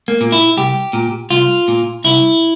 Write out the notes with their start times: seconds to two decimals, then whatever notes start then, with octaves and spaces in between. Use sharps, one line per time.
0.08 A#3
0.21 A#2
0.32 E4
0.57 C2 G4
0.93 A#2
1.30 C2 F4
1.68 A#2
2.04 C2 E4